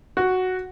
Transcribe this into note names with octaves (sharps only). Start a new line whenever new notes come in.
F#4